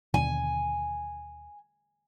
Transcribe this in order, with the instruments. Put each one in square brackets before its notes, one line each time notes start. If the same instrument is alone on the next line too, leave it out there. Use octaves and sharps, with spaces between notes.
[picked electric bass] D#2 B2 D3 [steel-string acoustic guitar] G#5